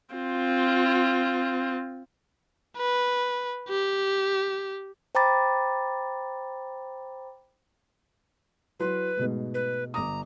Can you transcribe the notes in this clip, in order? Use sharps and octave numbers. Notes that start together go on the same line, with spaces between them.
C4 F4
B4
G4
C5 G5 A#5 B5 D6 A6
F#3 E4 B4 C6
G#2 B2 A3
B4
G1 A#5 D6 D#6